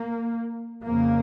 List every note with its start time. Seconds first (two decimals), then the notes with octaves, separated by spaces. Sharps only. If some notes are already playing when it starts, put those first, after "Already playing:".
Already playing: A#3
0.84 F2 C#3 A#3